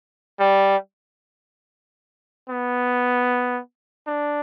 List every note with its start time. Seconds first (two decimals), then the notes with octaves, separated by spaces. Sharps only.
0.40 G3
2.50 B3
4.07 D4